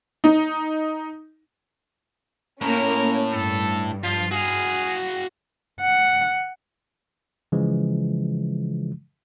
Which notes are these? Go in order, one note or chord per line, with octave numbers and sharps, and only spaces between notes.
D#4
A2 A#3 C#4 A#4
G2 A4
F3 F4
F#4 G#4 F5
F#5
C#3 E3 F3 G#3